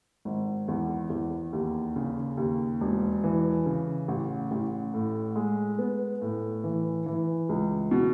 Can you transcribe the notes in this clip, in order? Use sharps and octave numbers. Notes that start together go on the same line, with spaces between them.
G#1
E2
E2
D#2
C#3
D#2
E1
E3
C#3
A1
A1
A2
G#3
B3
A2
E3
E3
C#2
B2